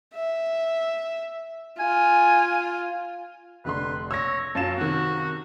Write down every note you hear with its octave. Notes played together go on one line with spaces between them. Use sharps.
E5
F4 G#5
F1 D3 B4 C6
C#5 E6 A#6
F#2 F4 A5 E7
C3 D#3 F#4